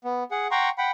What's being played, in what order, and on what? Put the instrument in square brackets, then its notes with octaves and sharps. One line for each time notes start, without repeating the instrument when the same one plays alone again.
[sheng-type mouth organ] B3
G#4 F#5
F#5 G5 A#5 C6 C#6
F#5 G5 B5